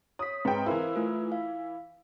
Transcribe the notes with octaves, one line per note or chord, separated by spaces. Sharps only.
C#5 D#6 B6
G#2 C4 B4 G5 A#5
E3 E4 A#4 C5 F5
A3 F4 B4
F5